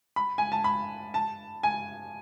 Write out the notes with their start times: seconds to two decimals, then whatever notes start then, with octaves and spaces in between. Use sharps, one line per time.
0.16 B5
0.38 G#5
0.52 A5
0.64 B5
1.14 A5
1.63 G#5